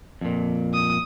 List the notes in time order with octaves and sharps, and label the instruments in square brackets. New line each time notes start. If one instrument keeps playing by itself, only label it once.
[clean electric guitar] F2 A#2
[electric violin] D#6